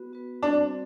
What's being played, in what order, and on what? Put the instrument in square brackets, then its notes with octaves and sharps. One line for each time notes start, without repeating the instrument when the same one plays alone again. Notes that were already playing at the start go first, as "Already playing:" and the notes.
Already playing: [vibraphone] B3 F#4 B4
B3 F#4 B4
[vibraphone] G3 C4 F#4 C5 [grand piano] D4